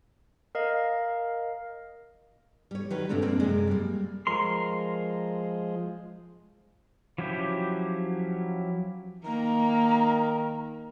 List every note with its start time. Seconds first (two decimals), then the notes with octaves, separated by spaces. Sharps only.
0.55 A#4 D#5 F5
2.71 G3 C#5
2.90 D#3 F#3 G4 B4
3.09 F#2 A#2 C#3 A3 C4 D4
3.22 F2 A#3 C4 D4
3.40 F#2 C3 G#3
3.67 G3 A#3
4.27 F3 G#3 A#4 C6
7.18 F3 F#3 C#4 E4 G4
9.25 D#3 A#3 A#5